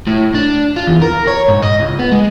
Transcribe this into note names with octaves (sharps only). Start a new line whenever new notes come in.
A2
D4
F4
E2
A#4
C#5
G#2
D#5
C#2
B3
G#3